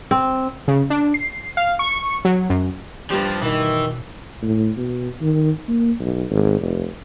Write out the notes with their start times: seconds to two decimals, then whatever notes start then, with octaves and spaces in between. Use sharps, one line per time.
0.11 C4
0.68 C#3
0.90 D4
1.14 C7
1.57 F5
1.79 C#6
2.25 F#3
2.50 F#2
3.10 G2 F3 G4
3.42 B2 D#3 E3
4.42 A2
4.77 B2
5.22 D#3
5.69 A#3
6.00 B1
6.30 G#1
6.61 F1